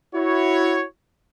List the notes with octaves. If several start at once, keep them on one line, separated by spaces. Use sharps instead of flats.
E4 F#4 C#5